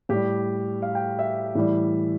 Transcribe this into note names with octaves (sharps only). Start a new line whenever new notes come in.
A2 G3 G4
F5
G5
E5
A2 E3 G3